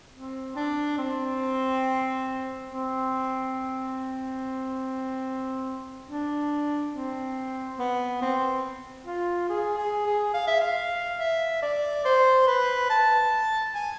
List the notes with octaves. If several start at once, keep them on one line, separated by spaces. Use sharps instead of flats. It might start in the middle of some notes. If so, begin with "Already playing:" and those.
C4
D4
C4
C4
D4
C4
B3
C4
F4
G#4
G#4
G#4
F5
E5
F5
E5
D5
C5
B4
A5
G#5